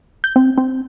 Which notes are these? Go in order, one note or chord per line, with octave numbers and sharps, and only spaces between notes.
G6
C4
C4